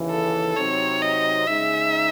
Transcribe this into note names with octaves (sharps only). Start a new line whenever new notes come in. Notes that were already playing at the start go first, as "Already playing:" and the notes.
Already playing: D#2 C#3 E3
A4
C3 F#3 C4 D#4 C#5
D#5
C#3 G#3 D#4 E5